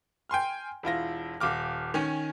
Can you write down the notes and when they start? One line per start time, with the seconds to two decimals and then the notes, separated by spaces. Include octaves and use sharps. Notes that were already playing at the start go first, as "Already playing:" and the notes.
0.29 G5 G#5 C6 F6
0.83 E1 E4 F4 A#6
1.40 D#1 F5 D6 F6
1.94 D#3 C#4 G#5